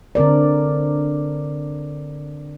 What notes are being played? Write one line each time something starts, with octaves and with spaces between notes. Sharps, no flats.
D3 C4 A#4 D5